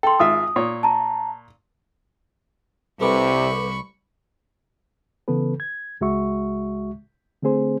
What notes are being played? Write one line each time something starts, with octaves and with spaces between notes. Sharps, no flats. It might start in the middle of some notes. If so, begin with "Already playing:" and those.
A4 G5 C6
G#1 F4 E5 D#6
A#2 C#5
A5 A#5
C2 C3 A4 B4 B5 C#6 D6
C#3 E3 B3 A4 B4
G#6
C#2 G#3 F#4 E5 C#6
D3 A3 C4 G#4 C5